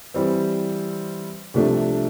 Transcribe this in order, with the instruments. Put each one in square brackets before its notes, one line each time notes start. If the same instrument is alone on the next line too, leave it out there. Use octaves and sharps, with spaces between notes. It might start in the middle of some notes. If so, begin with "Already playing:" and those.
[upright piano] E3 G3 C4
C2 C3 F3 A3 D4